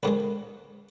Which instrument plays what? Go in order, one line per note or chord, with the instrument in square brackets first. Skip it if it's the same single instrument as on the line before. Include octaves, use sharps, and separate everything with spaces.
[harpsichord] A1 G#2 D#3 G#3 B4